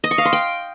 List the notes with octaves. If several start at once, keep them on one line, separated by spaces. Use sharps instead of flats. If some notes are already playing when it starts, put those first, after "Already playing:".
D#5
C#6
F5
C6
G5